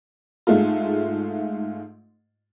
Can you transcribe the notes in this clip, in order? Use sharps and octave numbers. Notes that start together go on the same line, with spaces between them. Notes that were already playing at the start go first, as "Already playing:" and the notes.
G#2 G#3 A3 F4